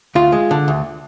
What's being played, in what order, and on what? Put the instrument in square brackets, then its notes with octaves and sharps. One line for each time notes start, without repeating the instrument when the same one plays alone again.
[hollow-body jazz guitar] D2 F4
G#3
D3
D2